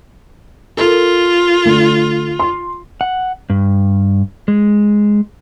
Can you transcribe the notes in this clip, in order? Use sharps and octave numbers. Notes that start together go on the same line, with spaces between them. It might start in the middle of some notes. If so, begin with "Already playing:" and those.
F4 A4 A#4
D3 A3
C6
F#5
G2
G#3